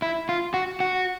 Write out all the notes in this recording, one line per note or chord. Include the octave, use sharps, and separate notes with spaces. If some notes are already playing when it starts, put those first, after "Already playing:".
E4
F4
F#4
F#4